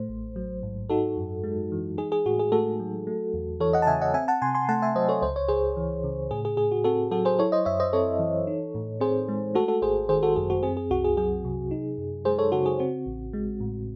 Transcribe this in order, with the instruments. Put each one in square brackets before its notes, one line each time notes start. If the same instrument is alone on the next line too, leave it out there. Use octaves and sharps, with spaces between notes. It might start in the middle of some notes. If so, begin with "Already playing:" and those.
Already playing: [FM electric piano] A2 A3 C5
A1
F#3
G#2
D#4 F#4 A4
F#2
G#3
E3
D#4 G#4
G#4
A2 F#4
G#4
A3 F#4 A4
F#3
A3
E2
E3 A4 C#5
D#5 F#5
A5
C#3 E5 G#5
D#5 F#5
C4 E5 G#5
F#5 A5
C3 G#5 C6
G#5 C6
A3 F#5 A5
E5 G#5
F#3 C5 D#5
A4 C#5
C#2 C5
C#5
C#2 G#4 C5
E3
C#3
A2 G#4
G#4
A2 G#4
F#4
C4 F#4 A4
F#3 F#4 A4
G#4 C5
E4 A4 C#5
C5 D#5
F#2 C#5 E5
C5 D#5
C4 A4 C#5
E3
D#4
A2
C4 G#4 C5
G#3
A3 F#4 A4
F#4 A4
G#1 G#4 C5
D#3 G#4 C5
F#4 A4
F#2 G#4
F#4
C4 G#4
G#4
C2 F#4
G#4
F#3 G#4
C3
D#4
F#2
G#3 G#4 C5
A4 C#5
C#3 F#4 A4
G#4
C4 F#4
A1
G#3
A2